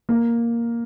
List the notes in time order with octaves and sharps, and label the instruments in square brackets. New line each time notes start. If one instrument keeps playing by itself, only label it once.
[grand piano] A#3